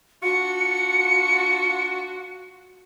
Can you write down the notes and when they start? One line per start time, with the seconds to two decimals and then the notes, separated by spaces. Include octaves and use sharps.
0.23 D4 F4 F#4 C#7